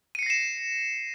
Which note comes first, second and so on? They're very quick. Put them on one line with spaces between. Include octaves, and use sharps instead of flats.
D#7 C#7 C7 A#6 E7